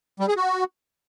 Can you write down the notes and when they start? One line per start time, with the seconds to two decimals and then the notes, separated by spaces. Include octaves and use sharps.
0.20 G3
0.28 G#4
0.36 F#4